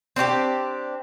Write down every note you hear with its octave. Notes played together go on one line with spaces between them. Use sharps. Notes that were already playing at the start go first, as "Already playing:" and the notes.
C4 D4 F#4 G4